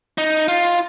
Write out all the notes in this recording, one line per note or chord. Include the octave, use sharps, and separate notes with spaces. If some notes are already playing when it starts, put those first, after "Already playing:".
D#4
F4